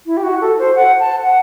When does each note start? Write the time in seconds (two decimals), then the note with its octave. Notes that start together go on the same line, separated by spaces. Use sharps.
0.06 E4
0.17 G4
0.23 F#4
0.41 A4
0.59 C5
0.76 F#5
1.00 A5
1.22 F#5